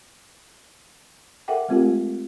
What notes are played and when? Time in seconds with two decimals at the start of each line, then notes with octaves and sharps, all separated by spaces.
1.48 A4 A#4 E5 F#5 G5 D6
1.68 G#3 A3 C4 F4 G4 A#4